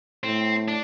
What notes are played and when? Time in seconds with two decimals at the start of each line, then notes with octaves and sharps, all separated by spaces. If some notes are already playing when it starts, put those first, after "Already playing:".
0.24 A2 C4
0.68 D4